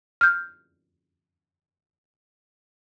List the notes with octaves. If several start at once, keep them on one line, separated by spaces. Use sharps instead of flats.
F6 G6